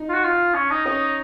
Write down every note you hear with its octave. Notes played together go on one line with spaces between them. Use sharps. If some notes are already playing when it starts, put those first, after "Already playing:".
Already playing: D#4
F4
F#4
F4
C#4
D#4
C#4 D#4